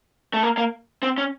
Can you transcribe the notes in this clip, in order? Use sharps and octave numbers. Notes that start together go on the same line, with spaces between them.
A3
A#3
A#3
C4
C#4